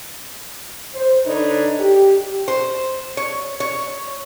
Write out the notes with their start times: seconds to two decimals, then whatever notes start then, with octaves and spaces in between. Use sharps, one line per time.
0.94 C5
1.26 D3 D4 D#4 A4 B4 C#5
1.80 G4
2.48 C5
3.17 C#5
3.60 C#5